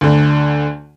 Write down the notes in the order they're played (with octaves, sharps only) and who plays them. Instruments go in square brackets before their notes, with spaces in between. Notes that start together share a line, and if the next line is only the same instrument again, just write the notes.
[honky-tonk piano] D2 D3